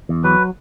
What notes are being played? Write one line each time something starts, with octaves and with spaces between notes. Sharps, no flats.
E2
F#3 B4